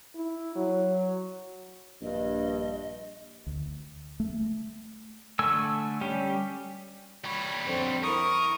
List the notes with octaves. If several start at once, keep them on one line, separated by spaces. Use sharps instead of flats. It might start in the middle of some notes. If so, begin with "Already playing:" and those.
E4
F#3
A#1 G2 D#5
D2
A3
D3 A3 G#5 E6
G3 C#4 G4
G3 C#5 B5
F2 D3 C4
E4 A#4 C#6 D#6